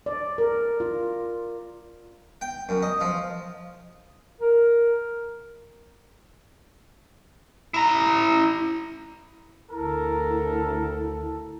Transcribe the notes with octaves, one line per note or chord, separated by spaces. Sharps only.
D5
A#4
F4
G5
F#2
D#5
F3
A#4
E4 A#5
D2 E4 A4 A#4